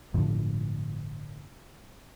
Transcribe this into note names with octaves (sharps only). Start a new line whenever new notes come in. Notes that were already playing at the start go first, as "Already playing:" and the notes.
G1 A2 D3 F3